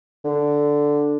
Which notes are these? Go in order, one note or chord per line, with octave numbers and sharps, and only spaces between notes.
D3